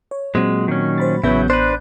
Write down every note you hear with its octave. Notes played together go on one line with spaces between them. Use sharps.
C#5
A#2 F#3 G#3 C4
D#3 C#4
C5 B5 A6
A1 C#3 F#3 B3 E4 G6
D4 B4 C5